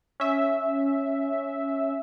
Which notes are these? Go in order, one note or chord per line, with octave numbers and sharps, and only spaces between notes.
C#4 E5